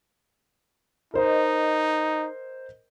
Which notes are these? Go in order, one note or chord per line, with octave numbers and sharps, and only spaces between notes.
D#4 A#4 C5 D#5